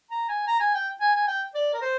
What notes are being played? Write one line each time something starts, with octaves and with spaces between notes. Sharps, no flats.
A#5
G#5
A#5
G#5
G5
G#5
G#5
G5
D5
A#4
C5